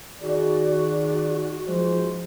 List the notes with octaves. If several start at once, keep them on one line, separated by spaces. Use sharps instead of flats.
D#3 D#4 F#4 G#4 D5
G#2 F3 G#3 C5